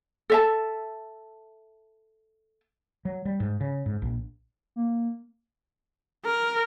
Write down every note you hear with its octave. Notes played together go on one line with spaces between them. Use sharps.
A4 E5 A5
F#3
G3
G#2
C#3
G#2
A#1
A#3
A#4